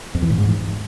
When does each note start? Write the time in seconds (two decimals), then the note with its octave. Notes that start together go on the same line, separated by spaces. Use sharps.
0.15 F2
0.22 E3
0.30 A2
0.38 G#2